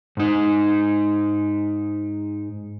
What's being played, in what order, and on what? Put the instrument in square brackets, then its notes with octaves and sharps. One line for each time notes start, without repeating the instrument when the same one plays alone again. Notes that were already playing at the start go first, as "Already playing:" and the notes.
[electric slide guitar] G#2 D#4